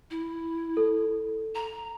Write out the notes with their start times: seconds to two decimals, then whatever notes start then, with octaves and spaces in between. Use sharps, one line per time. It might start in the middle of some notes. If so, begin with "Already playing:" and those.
0.10 E4
0.77 A4
1.55 A#5